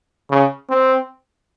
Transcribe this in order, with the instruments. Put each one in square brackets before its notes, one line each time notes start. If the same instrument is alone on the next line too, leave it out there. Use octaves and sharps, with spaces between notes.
[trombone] C#3
C4